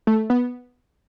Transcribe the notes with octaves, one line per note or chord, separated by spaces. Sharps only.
A3
B3